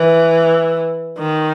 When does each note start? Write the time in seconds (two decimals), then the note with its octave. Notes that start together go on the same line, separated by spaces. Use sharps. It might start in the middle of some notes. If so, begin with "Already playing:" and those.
Already playing: E3
1.18 D#3